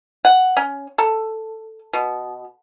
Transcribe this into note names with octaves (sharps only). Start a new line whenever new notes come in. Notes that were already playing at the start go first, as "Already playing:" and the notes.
F#5
C#4
A4
B2